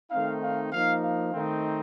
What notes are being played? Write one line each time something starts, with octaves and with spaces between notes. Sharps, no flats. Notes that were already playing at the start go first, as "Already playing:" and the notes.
D#3 A3 C4 D#4 F5
F5
F3 A#3 D#4 F5
F5
D#3 A3 C4 D#4